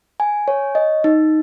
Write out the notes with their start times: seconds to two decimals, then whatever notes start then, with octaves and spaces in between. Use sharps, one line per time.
0.20 G#5
0.48 C#5
0.75 D#5
1.04 D#4